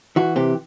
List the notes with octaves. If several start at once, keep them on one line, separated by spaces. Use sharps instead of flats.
E3 F#4
C3 G4